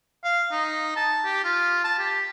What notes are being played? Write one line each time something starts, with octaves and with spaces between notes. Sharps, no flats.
F5
D#4
A5
G4
F4
A5
G4